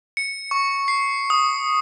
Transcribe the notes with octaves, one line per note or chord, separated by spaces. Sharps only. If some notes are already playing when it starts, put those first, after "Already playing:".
C#7
C#6
C7
D#6